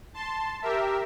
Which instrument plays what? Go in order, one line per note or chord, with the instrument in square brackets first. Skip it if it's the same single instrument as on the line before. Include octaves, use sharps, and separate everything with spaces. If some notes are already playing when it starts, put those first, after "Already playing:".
[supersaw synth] A5 C6
G4 A#4 E5